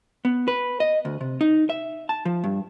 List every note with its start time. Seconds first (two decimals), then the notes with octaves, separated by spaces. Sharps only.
0.25 B3
0.48 B4
0.80 D#5
1.05 D2
1.21 C3
1.41 D#4
1.70 E5
2.09 A5
2.25 F3
2.44 G2